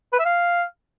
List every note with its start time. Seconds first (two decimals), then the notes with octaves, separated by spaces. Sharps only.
0.13 B4
0.19 E5
0.26 F5